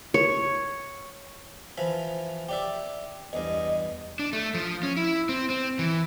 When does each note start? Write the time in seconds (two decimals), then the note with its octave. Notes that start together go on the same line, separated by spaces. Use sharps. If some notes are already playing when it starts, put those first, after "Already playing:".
0.14 C#5
1.78 E3 F3 B5
2.49 G4 D5 E5
3.33 E2 G2 D#5
4.19 D4
4.33 A3
4.54 F3
4.83 C#4
4.96 E4
5.29 C4
5.50 C4
5.79 E3